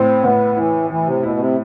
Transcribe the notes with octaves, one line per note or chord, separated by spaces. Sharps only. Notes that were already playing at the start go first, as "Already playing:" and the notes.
Already playing: A2 C4 E4
A2 B3
E3 E4
E3 E4
C3
B2 E4
C3